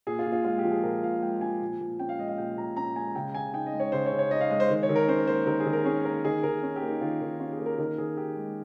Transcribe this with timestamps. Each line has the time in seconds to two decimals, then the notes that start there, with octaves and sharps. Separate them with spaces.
0.07 A#2 G#4
0.19 F4
0.26 A#2
0.32 F4
0.45 G#3 F4
0.58 G4
0.65 F3
0.71 G#4
0.83 A#2 A#4
1.03 A#2 F5
1.22 G#3 G5
1.41 F3 G#5
1.61 A#2
1.80 A#2
1.99 C#4 G5
2.09 F5
2.19 G#3 D#5
2.28 F5
2.38 A#2 G5
2.57 A#2 A#5
2.77 C#4 A#5
2.96 G#3 G#5
3.15 C#3 G5
3.34 C#3 G#5
3.54 D#4 G5
3.66 D#5
3.73 G#3
3.80 C#5
3.92 C#3 C5
4.06 C#5
4.12 C#3
4.19 C#5
4.31 D#4 D#5
4.41 F5
4.51 G#3 D#5
4.60 C5
4.70 D#3
4.83 C#5
4.89 D#3
4.95 A#4
5.08 C#4 C5
5.27 A#3 C5
5.47 D#3 A#4
5.60 G#4
5.66 D#3
5.73 A#4
5.85 C#4 G#4
6.05 A#3 A#4
6.24 D#3 G#4
6.43 D#3 A#4
6.63 C#4
6.76 G4
6.82 A#3
6.89 D#4
7.01 D#3 F4
7.21 D#3
7.40 C#4 F4
7.52 G#4
7.59 A#3
7.66 A#4
7.78 D#3 A#4
7.98 D#3 G#4
8.17 D#4 G4
8.37 G#3